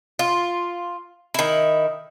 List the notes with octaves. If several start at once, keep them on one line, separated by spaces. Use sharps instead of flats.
F4
D#3 E4